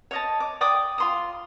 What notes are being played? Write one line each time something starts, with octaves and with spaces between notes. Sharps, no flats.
C#5 D#5 A5
D6
D5 G5 D6 D#6
F4 C6 D#6